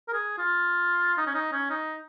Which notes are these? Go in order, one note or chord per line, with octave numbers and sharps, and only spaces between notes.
A#4
G#4
F4
D#4
C#4
D#4
C#4
D#4